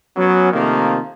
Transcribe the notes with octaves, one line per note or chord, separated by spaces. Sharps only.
F#3 B3 C#4
C3 D#3 F3 A3 A#3